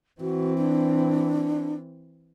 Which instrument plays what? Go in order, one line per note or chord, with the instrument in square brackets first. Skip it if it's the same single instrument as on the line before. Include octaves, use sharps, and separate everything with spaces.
[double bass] E3 C4 [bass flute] F#4
[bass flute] D4